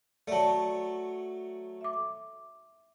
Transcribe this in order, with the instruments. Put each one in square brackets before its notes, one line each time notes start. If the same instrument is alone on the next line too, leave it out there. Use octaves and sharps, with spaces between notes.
[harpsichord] F#3 A3 [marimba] D5 A5
[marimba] E5 D6